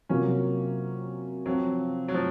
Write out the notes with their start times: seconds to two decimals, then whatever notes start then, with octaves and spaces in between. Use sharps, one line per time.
0.09 C3 F#3 A#3 C#4 F4
1.46 F3 F#3 C4 F4
2.08 F#3
2.14 F3